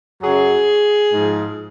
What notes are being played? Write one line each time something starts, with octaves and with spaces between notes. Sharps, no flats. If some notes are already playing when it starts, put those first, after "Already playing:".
F#2 C#3 F#3 G#4
G#2
F3